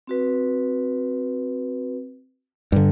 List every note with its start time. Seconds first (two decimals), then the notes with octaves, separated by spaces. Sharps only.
0.07 C4 F#4 B4
2.72 G2 D3